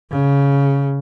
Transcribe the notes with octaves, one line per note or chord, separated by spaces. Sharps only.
C#3